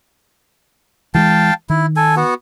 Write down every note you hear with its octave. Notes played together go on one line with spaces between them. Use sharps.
E3 F3 G#3 F5 G5 A5
D#3 E4
A4 G#5
B3 F#4